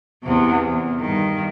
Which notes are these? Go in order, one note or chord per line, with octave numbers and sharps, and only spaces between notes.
E2 C3
E2
G2 D#3